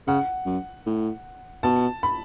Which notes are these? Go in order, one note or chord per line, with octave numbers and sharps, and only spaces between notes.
C#3 F#5
F#2
A2
B2 A5
B5